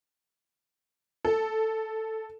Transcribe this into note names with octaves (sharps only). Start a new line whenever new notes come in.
A4